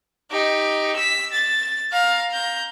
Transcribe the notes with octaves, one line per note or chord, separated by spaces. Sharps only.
D#4 G4
E6 B6
A6
F5 A#5
A#5 G6